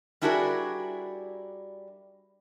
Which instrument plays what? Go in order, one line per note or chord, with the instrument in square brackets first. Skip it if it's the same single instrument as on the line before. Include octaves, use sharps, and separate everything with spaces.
[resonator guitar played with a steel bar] G3 D4 E4 F#4 G#4 A#4